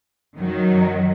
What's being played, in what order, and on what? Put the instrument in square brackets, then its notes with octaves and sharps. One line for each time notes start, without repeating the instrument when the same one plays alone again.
[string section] F#2 D#3 F#3